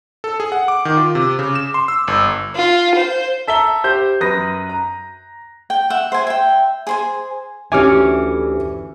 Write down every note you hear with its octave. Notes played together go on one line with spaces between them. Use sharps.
A4
G#4
F#5
D6
D#3
F4
C3
C#3
E7
C6
E6
G1
F4
C5
A4 E5 A#5 G7
G4 C5 G6
F#2 B4 D#6 A#6
A#5
G5
E5 F#5
C5 G#5
E5 G5
G#4 C5 G#5
D2 E3 C#4 G4 E5 G#5 D6 F6